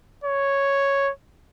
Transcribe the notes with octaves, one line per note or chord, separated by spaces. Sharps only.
C#5